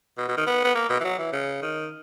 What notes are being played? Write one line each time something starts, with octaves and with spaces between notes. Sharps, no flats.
B2
B2
D#3
B3
B3
A#3
B2
E3
F#3
E3
C#3
D#3